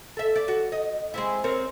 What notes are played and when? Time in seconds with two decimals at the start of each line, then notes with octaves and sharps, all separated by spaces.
0.17 A4 E5
0.36 D5
0.48 F#4
0.72 D#5
1.14 G#3 C4 E4
1.44 C4 A#4 C#5